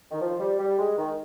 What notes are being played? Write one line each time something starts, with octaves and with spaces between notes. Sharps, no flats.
D#3
F3
G3
G3
G#3
D#3